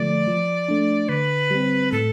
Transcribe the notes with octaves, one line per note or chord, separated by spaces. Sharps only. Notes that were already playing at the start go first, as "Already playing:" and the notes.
Already playing: D3 F3 A3 D5
F3
A3 D4
D3 B4
G3 C4
A2 A4